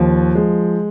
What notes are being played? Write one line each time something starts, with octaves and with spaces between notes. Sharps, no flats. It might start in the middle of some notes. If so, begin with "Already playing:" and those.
Already playing: D#2 F3
G#3